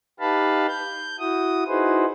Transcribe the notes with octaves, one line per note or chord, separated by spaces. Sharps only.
D#4 G4 B4 F5 A5 B5
G6
E4 F#4 D#6
D#4 E4 F#4 G#4 B4 C5